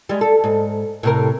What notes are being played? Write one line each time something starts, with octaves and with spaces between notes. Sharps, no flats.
G3 G#3
A4
G#2
A2 C3 A#4